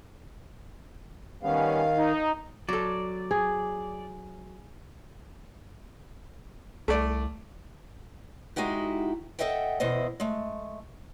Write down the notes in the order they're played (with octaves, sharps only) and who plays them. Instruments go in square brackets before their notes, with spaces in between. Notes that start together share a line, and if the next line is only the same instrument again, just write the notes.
[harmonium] D#3 F5 [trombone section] G3 B3 C#4
[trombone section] D#4
[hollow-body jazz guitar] F#3 A4 [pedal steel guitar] D5
[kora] G#4
[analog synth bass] C2 [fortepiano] A3 D5
[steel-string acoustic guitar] G#3 D#4 E4 F#4 G4
A4 A#4 D#5 E5 F#5 G5
E2 B2 E4 C5 D#5
G#3 A3